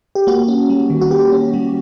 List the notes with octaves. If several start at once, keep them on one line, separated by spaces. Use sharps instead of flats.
G4
A#3 F#4
C#4
G3
D#3
F#4
A#3 G4
C#4
G3